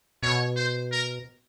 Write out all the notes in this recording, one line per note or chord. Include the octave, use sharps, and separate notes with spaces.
B2 C#5
C5
A#4